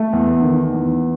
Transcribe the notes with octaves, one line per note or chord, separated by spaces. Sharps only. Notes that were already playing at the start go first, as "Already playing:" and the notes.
Already playing: A3
E2
D#3
E2